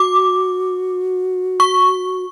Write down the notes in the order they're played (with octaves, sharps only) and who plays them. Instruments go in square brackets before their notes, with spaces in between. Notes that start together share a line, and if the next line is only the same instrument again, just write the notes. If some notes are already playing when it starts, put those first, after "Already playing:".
Already playing: [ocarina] F#4 [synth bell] D6
[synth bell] C#6